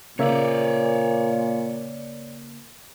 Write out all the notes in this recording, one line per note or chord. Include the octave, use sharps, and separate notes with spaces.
A#2 C#3 A#3 C#5 D5 E5